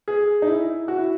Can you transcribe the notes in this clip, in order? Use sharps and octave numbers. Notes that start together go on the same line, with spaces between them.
G#4
D#4
E4
F#4
E4